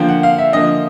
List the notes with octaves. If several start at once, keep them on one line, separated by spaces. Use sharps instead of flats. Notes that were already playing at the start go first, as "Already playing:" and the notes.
Already playing: D3 F3 A#3 G5
F#5
F5
E5
D3 F3 A#3 D#5